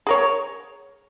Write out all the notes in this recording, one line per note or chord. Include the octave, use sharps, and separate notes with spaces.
G#4 A#4 C#5